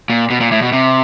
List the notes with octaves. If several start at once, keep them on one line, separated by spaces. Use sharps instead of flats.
A#2
B2
A#2
A2
B2
C3